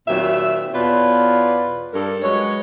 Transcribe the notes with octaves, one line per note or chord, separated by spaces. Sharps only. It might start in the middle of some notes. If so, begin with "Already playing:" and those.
D#2 A#2 F#3 C4 E5
E2 B2 F4 B4 C#5 D5
G2 A4 A#4
F#3 G#3 B4 C#5